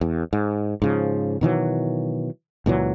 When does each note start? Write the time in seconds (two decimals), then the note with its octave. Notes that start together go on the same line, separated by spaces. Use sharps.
0.01 E2
0.33 G#2
0.82 G#2 C#3 F3
1.41 B2 D#3 E3 F#3
2.66 C#2 A#2 E3 F#3